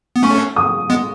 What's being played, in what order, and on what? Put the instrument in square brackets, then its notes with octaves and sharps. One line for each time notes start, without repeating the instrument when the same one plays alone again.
[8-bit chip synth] B3
[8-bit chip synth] A3 C#4 [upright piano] C#6
[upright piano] D#6
[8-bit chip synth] G#3 B3